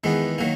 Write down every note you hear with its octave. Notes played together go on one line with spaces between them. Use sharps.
E2 D#3 G#3 B3
D#3 F#3 A#3